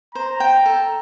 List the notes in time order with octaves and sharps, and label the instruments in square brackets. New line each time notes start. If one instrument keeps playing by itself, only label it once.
[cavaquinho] C5 [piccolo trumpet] A#5
[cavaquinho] G5
A4